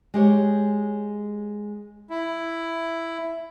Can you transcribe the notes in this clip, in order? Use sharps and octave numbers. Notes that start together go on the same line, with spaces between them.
G#3 G4 C#5
E4